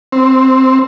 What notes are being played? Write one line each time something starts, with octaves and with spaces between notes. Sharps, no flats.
C4